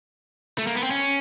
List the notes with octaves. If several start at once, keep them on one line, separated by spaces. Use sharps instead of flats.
A3
A#3
B3
C4
C#4